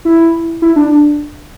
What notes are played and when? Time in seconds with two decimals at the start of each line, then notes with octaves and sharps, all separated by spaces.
0.05 E4
0.62 E4
0.76 D4